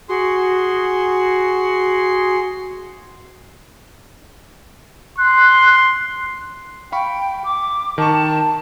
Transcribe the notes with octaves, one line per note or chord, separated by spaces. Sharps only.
F#4 G#4 C6
C6 F#6
F5 G5 B5 C#6
D6
D#3 A5 C#6